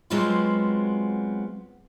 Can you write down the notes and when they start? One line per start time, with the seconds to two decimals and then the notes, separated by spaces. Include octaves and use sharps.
0.10 F#3 G#3 B3 C4 F4 F#4